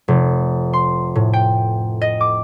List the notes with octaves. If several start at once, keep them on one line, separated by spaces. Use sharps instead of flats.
F1
C6
A2
G5
D#5
D6